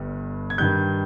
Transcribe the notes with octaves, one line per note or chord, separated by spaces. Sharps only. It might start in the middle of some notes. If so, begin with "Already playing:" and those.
Already playing: G1 G2 G3
G#6
G2 D#3 G3 G6